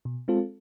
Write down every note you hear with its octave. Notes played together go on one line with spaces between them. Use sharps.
B2
G#3 C4 F4 A4